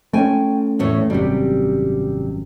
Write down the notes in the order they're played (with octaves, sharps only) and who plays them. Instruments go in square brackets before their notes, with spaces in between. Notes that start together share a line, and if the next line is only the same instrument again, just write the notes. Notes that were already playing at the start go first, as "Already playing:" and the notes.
[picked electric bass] A3 C4 C#4 [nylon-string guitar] G5 G#5
[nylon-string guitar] E2 A2 C#5
[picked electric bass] G#1 F#2 [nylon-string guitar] C3 G3